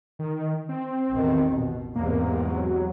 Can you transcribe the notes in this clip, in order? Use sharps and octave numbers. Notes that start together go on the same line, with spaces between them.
D#3
C4
A1 E2 D#3
B2
E2 G#2 C3 A#3
F#3